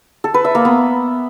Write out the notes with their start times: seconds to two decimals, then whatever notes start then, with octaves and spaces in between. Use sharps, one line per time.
0.24 A4
0.34 B4
0.45 E5
0.55 A#3
0.65 B3